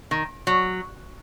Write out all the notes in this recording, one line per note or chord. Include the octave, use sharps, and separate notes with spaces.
D#3
F#3